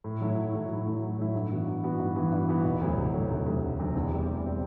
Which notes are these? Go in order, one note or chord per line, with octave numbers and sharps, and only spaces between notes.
A2
F#3 A3 E4
A2
F#3 A3 E4
A2
F#3 A3 E4
A2
F#3 A3 E4
G2
E3 B3 F#4
G2
E3 B3 F#4
G2
E3 B3 F#4
G2
E3 B3 F#4
E1
D2 C3 F#3
E1
D2 C3 F#3
E1
D2 C3 F#3
E1
D2 C3 F#3
E2
C3 G3 C4 G4
E2
C3 G3 C4 G4